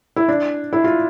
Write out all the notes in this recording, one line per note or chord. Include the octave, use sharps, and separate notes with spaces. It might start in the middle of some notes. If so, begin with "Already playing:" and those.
E4
D4
E4
F4